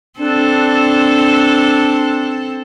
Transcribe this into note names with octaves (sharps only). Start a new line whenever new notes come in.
C4 D4 A4